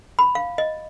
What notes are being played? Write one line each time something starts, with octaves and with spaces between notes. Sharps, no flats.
B5
F5
D#5